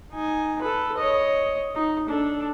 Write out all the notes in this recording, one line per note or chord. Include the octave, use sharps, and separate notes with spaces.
D#4 G#5
A4 B4
C#5 D#5
D#4
D4 A4